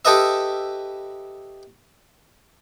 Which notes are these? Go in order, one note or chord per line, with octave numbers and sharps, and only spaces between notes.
G4 A4 B4 D#5 E5